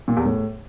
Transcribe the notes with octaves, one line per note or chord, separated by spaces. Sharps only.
A#2
E2
A2